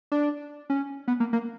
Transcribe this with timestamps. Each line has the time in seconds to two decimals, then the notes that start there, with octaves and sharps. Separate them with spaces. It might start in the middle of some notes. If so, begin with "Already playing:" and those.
0.12 D4
0.70 C#4
1.08 B3
1.20 A#3
1.33 A#3